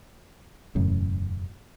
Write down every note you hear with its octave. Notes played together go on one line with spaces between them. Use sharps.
E1 F#2 A2 C#3